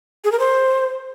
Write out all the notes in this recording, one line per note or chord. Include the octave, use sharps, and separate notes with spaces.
G#4
A#4
C5